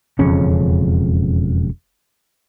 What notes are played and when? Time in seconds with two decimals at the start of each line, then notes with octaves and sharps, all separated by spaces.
0.19 E1 F2 C#3 C#4